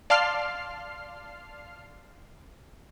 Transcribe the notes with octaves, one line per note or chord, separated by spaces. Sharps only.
D5 F5 A5 C6 F6 C7